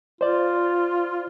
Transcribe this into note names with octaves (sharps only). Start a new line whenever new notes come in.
F4 C5 D5